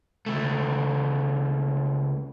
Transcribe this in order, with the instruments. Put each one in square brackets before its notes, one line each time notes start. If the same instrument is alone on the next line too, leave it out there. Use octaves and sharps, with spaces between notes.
[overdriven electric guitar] C#2 A3